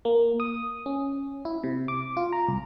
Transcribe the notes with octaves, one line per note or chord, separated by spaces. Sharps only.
A#3
D#6
C#4
E4
C3
D6
F4
A#5
C2